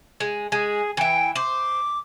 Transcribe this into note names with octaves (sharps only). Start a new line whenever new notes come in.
G#3
G#3 G#4
E3 E5 G5
C5 D6